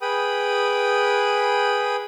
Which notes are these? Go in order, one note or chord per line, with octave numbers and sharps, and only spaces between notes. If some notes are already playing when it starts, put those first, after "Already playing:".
G#4 B4 G5 B5 D#6